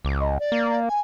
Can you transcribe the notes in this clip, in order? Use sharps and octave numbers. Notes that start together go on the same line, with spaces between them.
C#2 D6
D#5
D5
A#3
G#5